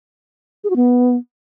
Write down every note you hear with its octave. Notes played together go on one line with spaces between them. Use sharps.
G#4
F#4
B3